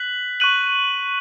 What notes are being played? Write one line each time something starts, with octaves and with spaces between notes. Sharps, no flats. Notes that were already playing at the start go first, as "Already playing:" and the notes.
Already playing: F#6 B6 F#7
C#6 F#6 D#7 F#7